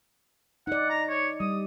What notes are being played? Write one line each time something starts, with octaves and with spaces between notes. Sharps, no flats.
D#4 D5 F#5
A#5
C#5
G3 D#6